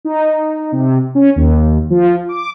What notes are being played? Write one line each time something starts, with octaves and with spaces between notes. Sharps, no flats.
D#4
C3
C#4
D#2
F3
D6